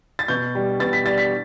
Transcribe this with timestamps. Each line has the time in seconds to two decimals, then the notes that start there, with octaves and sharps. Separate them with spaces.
0.19 A6
0.28 B2 G6
0.55 G3 D4
0.80 B2 A6
0.93 B6
1.06 G3 D4 A6
1.18 B6